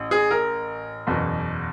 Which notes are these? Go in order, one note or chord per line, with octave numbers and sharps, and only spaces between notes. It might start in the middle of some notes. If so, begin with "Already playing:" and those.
Already playing: A1
G#4
A#4
F#1 E2 B2